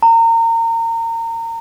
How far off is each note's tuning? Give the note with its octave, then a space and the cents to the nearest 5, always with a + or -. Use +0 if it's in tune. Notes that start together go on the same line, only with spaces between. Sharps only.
A#5 -30